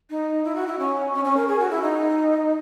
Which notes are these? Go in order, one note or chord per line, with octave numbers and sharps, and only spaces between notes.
D#4
E4
F#4
E4
C#4
C#4
C#4
A#4
G#4
F#4
E4
D#4